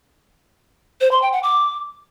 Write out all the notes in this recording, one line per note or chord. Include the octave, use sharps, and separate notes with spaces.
C5
C6
G5
F#5
D6